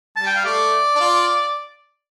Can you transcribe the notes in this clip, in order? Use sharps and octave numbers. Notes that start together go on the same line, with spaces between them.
G3 A5
G5
F5
A3 D5
D4
F4